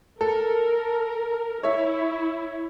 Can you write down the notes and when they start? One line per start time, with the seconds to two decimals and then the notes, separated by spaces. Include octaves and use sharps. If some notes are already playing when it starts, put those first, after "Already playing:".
0.21 A4 A#4
1.63 E4 C#5 E5